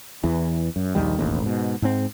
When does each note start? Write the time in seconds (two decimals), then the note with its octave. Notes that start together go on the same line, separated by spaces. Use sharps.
0.24 E2 E3
0.76 F#2
0.95 A#1 D#2 D#3 G3
1.18 E1 A1 D#2
1.43 G#2 B2
1.82 G#2 C4